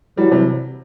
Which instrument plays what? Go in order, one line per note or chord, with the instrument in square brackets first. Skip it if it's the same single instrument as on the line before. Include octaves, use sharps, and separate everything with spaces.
[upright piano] E3 G3 [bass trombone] F#3
[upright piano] C3 E3